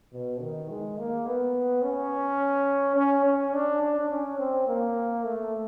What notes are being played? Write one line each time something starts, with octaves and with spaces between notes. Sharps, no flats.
B2
D#3
G#3
A#3
B3
C#4
C#4
C#4
D4
D4
C#4
C4
A#3
A3